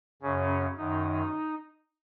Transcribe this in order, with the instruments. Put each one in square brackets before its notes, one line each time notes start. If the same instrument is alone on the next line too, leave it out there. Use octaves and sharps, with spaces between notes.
[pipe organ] F#2 C#3 C#4
F#2 D#3 D#4